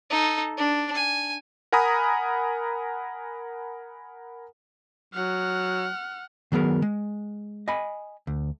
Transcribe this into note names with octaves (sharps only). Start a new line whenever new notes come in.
D#4 A4
D4
G#5
A#4 F#5 G#5 A#5 B5 D#6
F#3 F#5 F6
D#3 F#3 B3 G#4 A#4
G#3
D#5 G#5 B5
D2